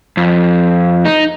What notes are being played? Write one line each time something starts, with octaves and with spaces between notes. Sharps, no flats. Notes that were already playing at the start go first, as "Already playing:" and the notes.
F2
D#4